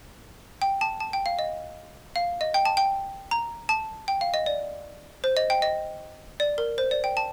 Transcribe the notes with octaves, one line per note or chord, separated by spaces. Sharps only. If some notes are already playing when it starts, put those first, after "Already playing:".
G5
A5
A5
G5
F5
D#5
F5
D#5
G5
A5
G5
A#5
A5
G5
F5
D#5
D5
C5
D#5
G5
D#5
D5
A#4
C5
D5
G5
A5